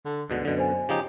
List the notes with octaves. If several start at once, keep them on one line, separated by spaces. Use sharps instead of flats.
D3
D2 G#2 B2 D3
F#2 B2 D3
C5 G#5
C#3 F3 D#4 G4